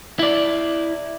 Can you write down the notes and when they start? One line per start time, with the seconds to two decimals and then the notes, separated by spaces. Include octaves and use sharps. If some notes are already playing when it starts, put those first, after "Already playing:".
0.19 E4 D5